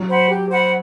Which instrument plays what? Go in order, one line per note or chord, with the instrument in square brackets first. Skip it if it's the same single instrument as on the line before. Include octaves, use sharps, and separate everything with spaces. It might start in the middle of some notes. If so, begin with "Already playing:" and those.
Already playing: [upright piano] F#3
[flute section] C5 F#5 B5
G4
C5 F#5 B5